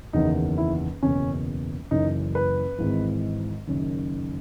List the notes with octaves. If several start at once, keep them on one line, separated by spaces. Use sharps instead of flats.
F#1 E2 D#3 D#4
E4
F#1 E2 B2 C#4
F#1 F#2 E3 D#4
B4
G#1 G#2 E3
F#1 F#2 D#3